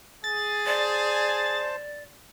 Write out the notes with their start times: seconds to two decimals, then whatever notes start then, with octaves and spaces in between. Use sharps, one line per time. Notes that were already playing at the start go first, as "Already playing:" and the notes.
0.24 G#4 A6
0.66 C5 D5 A5